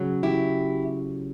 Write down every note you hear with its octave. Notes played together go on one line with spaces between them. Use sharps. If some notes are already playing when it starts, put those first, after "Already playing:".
Already playing: C#3 F#3
E4 G4